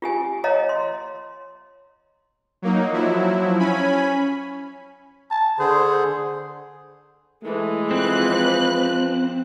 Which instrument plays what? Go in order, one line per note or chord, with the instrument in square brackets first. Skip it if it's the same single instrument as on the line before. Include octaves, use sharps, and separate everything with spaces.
[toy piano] F4 G4 G#5
C#5 D#5 F5 A#5
C6
[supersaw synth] F#3 A#3 D#4
F3 F#3 E4
C#4 G#5 B5
[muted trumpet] A5
[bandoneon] D3 G#4 [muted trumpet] C5
[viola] E3 G#3 [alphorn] A3
[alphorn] F3 [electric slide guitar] C4 [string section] B4 F#6